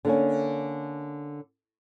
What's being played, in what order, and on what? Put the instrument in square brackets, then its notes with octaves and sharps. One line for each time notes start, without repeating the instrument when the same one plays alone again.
[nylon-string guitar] D3 A#3 C#4